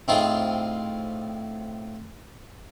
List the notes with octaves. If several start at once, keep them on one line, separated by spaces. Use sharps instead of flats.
A2 C4 D#4 F4 G#4